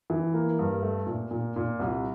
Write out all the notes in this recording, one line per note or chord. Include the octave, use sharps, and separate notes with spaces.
E3
A#3
G2
A3
A#2
A#2
A#2
C2